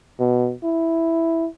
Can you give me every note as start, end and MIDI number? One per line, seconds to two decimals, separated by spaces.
0.20 0.53 47
0.64 1.47 64